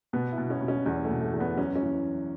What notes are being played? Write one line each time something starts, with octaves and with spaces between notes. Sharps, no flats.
B2 B3
E4
B2
C#4
B2
C#4
E2 C#4
A3
B2
A3
E2
B3
F#2 C#4
C#4
E3